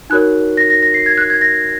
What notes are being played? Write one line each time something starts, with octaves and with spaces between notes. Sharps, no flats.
D#4 F#4 A#4 C#5 F#6
A#6
A#6
A#6
C7
G#6
F#6
G#6
A#6